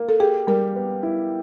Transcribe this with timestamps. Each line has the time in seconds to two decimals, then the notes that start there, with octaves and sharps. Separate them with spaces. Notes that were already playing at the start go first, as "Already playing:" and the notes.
Already playing: A#3
0.09 A4
0.20 G4 G#4
0.47 G3 A#4
0.75 B3
1.03 E4